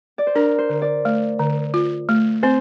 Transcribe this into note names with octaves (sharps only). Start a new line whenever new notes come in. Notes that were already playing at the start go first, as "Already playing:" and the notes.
D5
C5
D4 A#4
C5
D3
D5
A3
D3
F4
A3
C4 C5